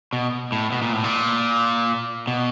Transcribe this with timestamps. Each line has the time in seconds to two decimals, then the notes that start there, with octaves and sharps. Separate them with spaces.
0.13 B2
0.52 A2
0.72 B2
0.82 A#2
0.93 A2
1.04 A#2
2.27 B2